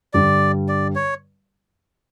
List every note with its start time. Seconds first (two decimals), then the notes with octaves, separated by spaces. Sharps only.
0.14 G2 D3 G3 D5
0.69 D5
0.95 C#5